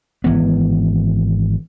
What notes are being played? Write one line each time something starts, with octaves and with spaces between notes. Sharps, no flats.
G#1 E3 B3